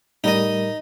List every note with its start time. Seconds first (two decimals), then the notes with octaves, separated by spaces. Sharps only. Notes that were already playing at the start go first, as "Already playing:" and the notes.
0.24 A2 G3 D#4 A#4 D#5